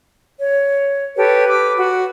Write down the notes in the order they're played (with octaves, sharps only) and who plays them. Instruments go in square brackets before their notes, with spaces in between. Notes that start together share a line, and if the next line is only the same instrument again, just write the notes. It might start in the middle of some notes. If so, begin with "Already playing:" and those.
[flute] C#5
[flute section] G4 A4 C#5 [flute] B4
[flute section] D6 E6
F#4